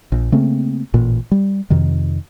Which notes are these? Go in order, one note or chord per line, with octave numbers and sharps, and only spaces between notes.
A#1
C#3 A3 A#3 C4
A1 A#2
G3
F2 C3 D#3